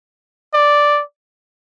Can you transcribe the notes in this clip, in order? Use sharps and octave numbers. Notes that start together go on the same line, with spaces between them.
D5